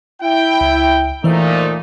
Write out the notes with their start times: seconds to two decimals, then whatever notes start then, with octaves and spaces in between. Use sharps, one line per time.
0.22 E4 G5
0.61 C#2
1.24 A#2 E3 A3 D#4 C5